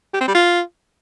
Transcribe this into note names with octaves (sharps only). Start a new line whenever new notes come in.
G4
C4
G3
F4